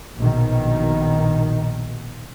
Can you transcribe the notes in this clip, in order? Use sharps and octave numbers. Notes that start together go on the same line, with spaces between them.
A#1 B2 D#3